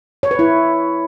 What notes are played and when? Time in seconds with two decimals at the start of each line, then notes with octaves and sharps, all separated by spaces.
0.23 C#5
0.31 B4
0.39 E4